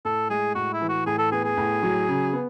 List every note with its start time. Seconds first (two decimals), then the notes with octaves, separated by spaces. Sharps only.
0.05 A2 A4
0.30 G#3 G#4
0.55 A2 F#4
0.73 E4
0.81 E3
0.89 F#4
1.06 A2 G#4
1.18 A4
1.32 B3 G#4
1.44 G#4
1.57 A2
1.83 F#3
2.08 C#3
2.33 B3